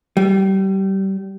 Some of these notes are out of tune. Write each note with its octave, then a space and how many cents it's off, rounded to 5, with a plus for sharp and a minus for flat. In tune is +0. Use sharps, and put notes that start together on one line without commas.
G3 -25